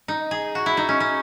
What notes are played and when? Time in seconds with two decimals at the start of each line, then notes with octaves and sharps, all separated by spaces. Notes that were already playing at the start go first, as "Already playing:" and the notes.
0.08 D#4
0.31 G#4
0.55 F#4
0.66 E4
0.77 D#4
0.89 C#4
1.00 C#4